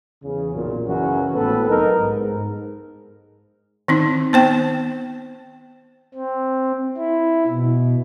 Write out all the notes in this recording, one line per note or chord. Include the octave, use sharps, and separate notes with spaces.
E2 C#3
B1 F#2 A#2
F#2 C#3 E3 F#3 C#4 F#4
G#1 A2 B3 C4 A4 B4
B1 D#4 A#4
G#2
D#3 C4 D#4
B3 C5 G5
C4
E4
B2